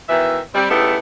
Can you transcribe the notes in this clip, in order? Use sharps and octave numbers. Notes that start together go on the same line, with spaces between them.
B2 D#3 E3 E5
G3 C4
C#3 A3 B3 D#4 E4 G4